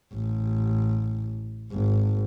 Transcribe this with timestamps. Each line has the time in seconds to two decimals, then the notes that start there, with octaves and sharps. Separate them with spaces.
0.13 A1
1.72 G#1